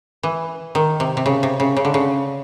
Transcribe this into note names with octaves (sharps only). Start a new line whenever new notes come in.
E3
D#3
C3
C3
C#3
C3
C#3
C#3
D3
C#3